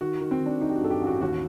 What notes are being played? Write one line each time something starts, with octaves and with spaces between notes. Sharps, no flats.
D#3 F#4
D#3
C4
D#3
D4
D#3 D#4
G4
F#4
G2 A4
G4
A1
F#4
D#2 F#4